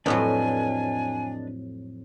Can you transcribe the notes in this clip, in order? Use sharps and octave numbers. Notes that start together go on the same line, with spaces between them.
F2 A2 F#3 D4 B4 D#5 G#5